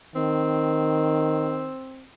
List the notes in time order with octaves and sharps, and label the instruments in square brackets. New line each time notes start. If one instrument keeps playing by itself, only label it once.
[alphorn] D#3 [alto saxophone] C4